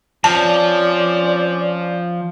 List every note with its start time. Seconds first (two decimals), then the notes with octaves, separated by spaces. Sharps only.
0.24 F3 C4 C#4 D5 A5